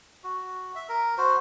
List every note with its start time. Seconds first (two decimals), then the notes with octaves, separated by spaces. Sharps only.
0.24 F#4
0.76 E5
0.89 A#4
1.18 F#4 C5